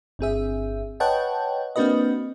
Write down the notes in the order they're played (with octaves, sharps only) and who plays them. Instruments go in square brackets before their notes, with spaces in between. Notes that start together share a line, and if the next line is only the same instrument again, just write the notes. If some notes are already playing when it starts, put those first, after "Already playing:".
[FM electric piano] G1 C4 G#4 E5
B4 C#5 D#5 F#5 G5 A5
A#3 C4 D4 F#4 B4 D#5